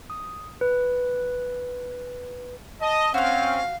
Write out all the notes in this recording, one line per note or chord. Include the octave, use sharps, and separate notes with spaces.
D#6
B4
D#5 A5
C4 C#4 F#4 F5 F6